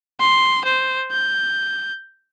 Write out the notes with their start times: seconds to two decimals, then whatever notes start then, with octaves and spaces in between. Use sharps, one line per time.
0.20 C6
0.65 C5
1.12 G6